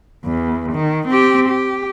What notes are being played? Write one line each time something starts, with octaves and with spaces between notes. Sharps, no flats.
E2
D#3
C4 G4
G4